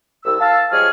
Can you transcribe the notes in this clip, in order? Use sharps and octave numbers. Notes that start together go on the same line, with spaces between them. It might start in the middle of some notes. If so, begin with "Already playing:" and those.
C2 E6
F5 A5 E6
F3 G3 G#3 G#4 C#5 F6